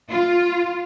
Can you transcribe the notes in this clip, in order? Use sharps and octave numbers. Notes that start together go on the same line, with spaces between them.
F4